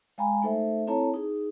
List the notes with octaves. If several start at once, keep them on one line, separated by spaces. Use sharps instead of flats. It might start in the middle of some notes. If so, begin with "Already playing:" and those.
G#3 F5 G5 G#5 A#5 B5
A3 D#4 A4 C5 E5
C4 E4 A4 C#5 A5 A#5
D#4 G#4